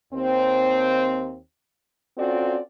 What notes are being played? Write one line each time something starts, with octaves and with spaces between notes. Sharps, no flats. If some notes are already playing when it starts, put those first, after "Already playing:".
D#2 C4
C4 C#4 F4 F#4 A4 D5